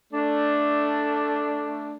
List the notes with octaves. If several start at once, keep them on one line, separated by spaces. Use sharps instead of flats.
A3 D4